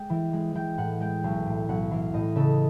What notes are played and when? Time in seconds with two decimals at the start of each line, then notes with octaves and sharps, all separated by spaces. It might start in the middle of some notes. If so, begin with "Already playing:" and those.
Already playing: G#3 G5
0.10 E3
0.33 G#3
0.55 E3 G5
0.77 A2 F#5
1.00 G#3 G5
1.24 B1
1.46 A2
1.69 B1 F#5
1.91 E3 F5
2.13 A2 D#5
2.36 C#3 A4